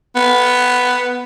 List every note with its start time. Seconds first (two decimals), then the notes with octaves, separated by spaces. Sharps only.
0.16 B3